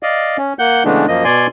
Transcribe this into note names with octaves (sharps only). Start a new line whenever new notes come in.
D5 D#5 F5
C#4
A#3 F#5 G6
C#3 E3 G#3 A3 B3 D4
F#2 F3 A#3 D#5
B2 D5 G#5 C6